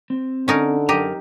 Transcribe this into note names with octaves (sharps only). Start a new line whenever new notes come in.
C4
D3 C#4 D#4 A#4
F#2 G4 A#4 D#5 A#5